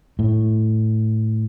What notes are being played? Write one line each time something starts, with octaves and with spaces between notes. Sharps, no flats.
A2